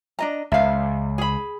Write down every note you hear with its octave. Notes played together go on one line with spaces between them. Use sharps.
D4 D#5 A#5
C#2 E5 F5
G#4 B5